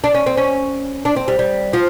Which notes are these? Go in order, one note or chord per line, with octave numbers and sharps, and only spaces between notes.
D4
C#4
C4
C#4
D4
C4
G3
G3
F3